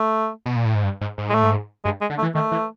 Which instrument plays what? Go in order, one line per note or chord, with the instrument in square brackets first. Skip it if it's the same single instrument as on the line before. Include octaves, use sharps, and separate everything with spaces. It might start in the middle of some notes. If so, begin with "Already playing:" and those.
Already playing: [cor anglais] A3
[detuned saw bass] B2
A#2
A2
G#2
G2
G#2
G#2
[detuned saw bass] A2 [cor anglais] G#3 A3
[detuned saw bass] G#2
[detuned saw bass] G2 [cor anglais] G#3
[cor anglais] G#3
[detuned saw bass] D3
[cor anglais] A3
[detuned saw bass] E3
[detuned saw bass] D#3 [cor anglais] A3
[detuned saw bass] E3